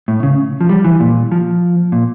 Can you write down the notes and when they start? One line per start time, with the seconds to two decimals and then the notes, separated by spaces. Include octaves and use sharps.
0.08 A2
0.23 C#3
0.61 F3
0.69 G3
0.85 E3
1.00 A#2
1.32 F3
1.92 A#2